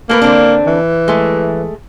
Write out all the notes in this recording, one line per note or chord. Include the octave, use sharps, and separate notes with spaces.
A3 A#3 A#4 B4
D3 C4 D4
E3
G#3 A3